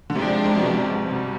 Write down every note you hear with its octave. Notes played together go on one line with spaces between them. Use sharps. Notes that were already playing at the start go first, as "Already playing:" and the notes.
D3
G#2 C3 F3 G#3 D4 G4
G#2
C3
B2
C3 G3